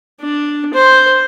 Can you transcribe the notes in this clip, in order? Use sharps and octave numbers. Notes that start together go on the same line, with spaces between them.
D4
C5